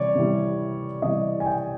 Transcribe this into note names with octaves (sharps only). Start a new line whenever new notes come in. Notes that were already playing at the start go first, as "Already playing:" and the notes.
Already playing: C3 E3 G3 C#5 D5
C3 E3 G3
C3 E3 G3 D#5
G#5
G5